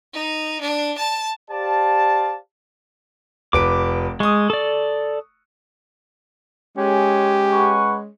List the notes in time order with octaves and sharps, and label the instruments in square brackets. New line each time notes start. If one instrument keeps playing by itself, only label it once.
[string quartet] D#4
D4
A5
[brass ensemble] G4 C5 D5 F5 A5
[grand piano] F1 B4 D7 [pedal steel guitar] D6
[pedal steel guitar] G#3 [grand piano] C#6 D#6
[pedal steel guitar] A4 D5
[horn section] G#3 C#4 [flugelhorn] G4
[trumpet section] B4 F#5 C#6